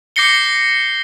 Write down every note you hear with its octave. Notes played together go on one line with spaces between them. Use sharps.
D6 G6 A#6 C7 C#7 G7